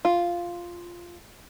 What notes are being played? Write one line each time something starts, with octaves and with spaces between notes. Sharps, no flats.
F4